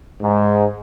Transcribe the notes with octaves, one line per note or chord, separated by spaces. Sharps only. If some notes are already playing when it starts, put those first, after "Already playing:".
G#2